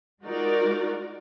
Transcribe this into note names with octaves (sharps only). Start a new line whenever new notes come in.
G#3 D#4 F4 F#4 A#4 D5